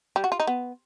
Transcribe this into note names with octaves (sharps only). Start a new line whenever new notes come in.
G3
F#4
F4
D#4
B3